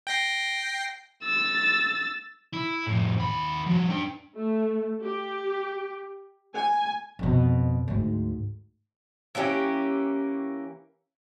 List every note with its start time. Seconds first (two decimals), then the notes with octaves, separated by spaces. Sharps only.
0.07 G5 A#6 C7
1.24 E6 A6
2.53 E4
2.87 F2 A2
3.17 D#2 B5
3.67 F3 F#4
3.90 D4 G5
4.36 A3
5.01 G4
6.56 G#5
7.19 F2 B2
7.88 D2 G#2
9.35 E3 A#3 C#4 G4